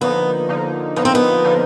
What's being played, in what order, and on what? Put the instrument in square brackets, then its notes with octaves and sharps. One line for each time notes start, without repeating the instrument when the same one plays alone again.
[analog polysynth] D3 F3 A#3 D#4 [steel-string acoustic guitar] B3
[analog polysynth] D3 F3 A#3 D#4
[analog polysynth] D3 F3 A#3 D#4 [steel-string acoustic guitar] B3
[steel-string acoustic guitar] C4
B3
[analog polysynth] D3 F3 A#3 D#4